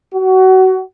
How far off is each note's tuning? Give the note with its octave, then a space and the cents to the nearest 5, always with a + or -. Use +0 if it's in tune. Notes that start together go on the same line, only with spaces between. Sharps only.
F#4 +25